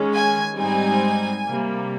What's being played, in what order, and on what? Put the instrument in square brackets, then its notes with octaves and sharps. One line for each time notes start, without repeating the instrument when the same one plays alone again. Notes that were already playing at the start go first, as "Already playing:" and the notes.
Already playing: [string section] D#3 G#3 C#4
G#5
G#2 G3 C4 D#4 G#5
C3 G3 A#3